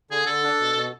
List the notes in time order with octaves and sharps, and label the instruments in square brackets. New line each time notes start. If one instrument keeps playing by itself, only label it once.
[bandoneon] D3 [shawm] G#4
[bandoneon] D3 [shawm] A4
[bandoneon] D4
B2
B2